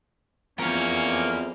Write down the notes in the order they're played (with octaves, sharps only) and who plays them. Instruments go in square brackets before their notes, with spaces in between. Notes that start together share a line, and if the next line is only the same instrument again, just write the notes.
[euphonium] E2 [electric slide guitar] F3 C4 [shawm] C#4 [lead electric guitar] A#4 F5